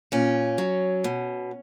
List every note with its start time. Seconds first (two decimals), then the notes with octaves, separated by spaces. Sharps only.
0.12 A#2 C#4
0.58 F#3
1.04 B2